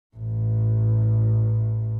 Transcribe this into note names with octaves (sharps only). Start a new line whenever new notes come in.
A1 A2